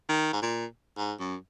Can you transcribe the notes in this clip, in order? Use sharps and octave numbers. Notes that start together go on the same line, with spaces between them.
D#3
G#2
A#2
G#2
F#2